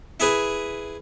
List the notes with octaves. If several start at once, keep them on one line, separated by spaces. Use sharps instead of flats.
E4 G#4 B4